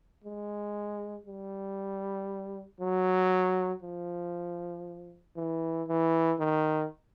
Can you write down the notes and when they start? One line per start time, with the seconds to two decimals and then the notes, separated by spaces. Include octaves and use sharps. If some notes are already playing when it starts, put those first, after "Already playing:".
0.24 G#3
1.27 G3
2.80 F#3
3.83 F3
5.37 E3
5.88 E3
6.40 D#3